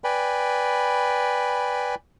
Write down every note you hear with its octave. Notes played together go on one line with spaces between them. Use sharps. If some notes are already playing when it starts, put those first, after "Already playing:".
B4 D5 G5 G#5 B5